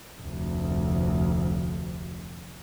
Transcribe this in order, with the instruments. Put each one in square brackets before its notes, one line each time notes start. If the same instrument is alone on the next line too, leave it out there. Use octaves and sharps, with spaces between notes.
[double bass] F1 D2